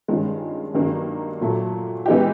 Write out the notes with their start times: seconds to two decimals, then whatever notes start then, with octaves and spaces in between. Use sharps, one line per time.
0.08 G2 D#3 G#3 C#4 F4
0.74 G2 D#3 F#3 A#3
1.41 A#2 F#3 A3
2.06 E3 G#3 B3 D#4 G4